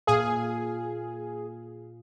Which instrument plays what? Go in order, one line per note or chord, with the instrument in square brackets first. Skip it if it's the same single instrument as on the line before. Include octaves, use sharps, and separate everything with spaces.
[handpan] A#2 F5 [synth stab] G#4